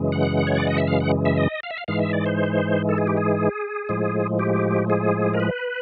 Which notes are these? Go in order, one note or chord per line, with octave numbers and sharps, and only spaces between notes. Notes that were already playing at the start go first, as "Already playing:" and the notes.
Already playing: F#2 C#3 E3 G#3
F#5
C#5
D5
D#5
E5
F5
F#5
E5
D#5
F5
E5
F5
G#2 E3 G#3 F5
E5
D5
C5
A4
G#4
G4
G#4
A2 F3 G#3
G4
G#4
A#4
B4